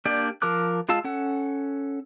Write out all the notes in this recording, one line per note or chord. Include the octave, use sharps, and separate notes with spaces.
A#3 D4 G4 D5
F3 A#4 A5 D6 F#6
G#3 F4 F5 A5 E6
C#4 A4 F#5